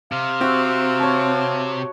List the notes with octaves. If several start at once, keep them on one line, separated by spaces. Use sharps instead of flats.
C3 F5
C4 F#4 E5
C#5 A5